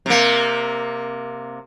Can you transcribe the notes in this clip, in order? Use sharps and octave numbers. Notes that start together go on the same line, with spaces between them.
C3 A#3